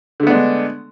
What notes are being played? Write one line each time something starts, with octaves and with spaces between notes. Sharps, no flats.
D3 G#3 A3 B3 D4